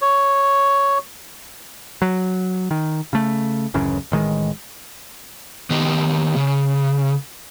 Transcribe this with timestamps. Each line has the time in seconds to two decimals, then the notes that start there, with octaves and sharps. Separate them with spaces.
0.02 C#5
2.02 F#3
2.71 D#3
3.13 C#3 A3
3.74 D1 A1 F#2 C#3
4.12 A1 D#3 G#3
5.70 D#3 B3 G4 D#5
6.36 C#3